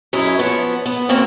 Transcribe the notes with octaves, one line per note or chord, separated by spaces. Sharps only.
F#2 D#4 E4 G#4
F3 B3 C#5
B3
A#3 C4 C#4 F#4 A#4